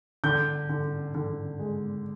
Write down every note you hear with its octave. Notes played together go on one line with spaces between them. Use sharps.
D3 G6
D3
D3
G#3